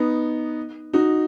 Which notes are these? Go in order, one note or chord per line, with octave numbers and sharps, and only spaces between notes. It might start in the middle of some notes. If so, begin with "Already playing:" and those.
Already playing: B3 D#4
D#4 F#4